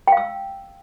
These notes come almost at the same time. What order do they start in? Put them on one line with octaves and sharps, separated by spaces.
G5 F5 E6